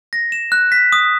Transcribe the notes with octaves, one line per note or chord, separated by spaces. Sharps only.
A#6
E7
F#6
B6
D#6